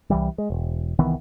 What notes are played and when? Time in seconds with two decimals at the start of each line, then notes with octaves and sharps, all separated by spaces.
0.10 C2 E3 G3
0.38 G#3
0.50 E1
0.99 C2 D#3 E3 B3